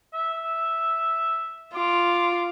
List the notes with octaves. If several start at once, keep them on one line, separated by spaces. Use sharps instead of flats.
E5
F4 D6